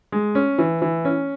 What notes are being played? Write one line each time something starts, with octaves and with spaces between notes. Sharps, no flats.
G#3
C#4
E3
E3
C#4